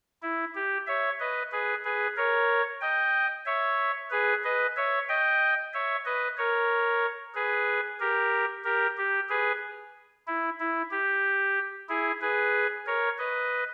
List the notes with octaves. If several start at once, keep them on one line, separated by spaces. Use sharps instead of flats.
E4
G4
C#5 E5
B4 D#5
G#4 B4
G#4 B4
A#4 C#5
D#5 G5
C#5 E5
G#4 B4
B4 D#5
C#5 E5
D#5 G5
C#5 E5
B4 D#5
A#4 C#5
G#4 B4
G4 A#4
G4 A#4
G4
G#4 B4
E4
E4
G4
E4 G#4
G#4 B4
A#4 C#5
B4 D#5